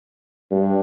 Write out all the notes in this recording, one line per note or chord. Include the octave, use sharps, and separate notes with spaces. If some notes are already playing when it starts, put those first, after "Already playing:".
G2